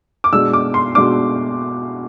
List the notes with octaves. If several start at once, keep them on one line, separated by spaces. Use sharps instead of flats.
D6
B2 G#3 D4 E6
D6
C6
B2 G#3 D4 D6